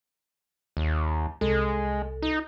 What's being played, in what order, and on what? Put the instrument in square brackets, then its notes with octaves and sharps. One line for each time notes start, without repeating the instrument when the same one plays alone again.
[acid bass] D#2
[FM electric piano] C2 A4 [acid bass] G#3
[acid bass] D#4